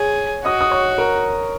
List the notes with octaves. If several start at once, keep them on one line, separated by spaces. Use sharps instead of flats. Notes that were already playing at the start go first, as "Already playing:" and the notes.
Already playing: G#4 C#5
F#4 D#5 D#6
D#6
C#5 C#6
A#4 A#5